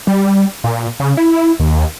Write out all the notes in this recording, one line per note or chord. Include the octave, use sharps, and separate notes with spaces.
G3
A#2
C#3
E4
D#2